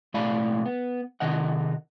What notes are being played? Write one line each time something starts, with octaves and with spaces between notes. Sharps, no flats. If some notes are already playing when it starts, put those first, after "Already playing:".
B1 A2 D5 F5 G#5 B5
B3
C3 D#3 D#5 F#5